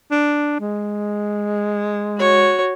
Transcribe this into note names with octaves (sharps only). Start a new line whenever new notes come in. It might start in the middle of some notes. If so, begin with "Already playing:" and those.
D4
G#3
F#4 C#5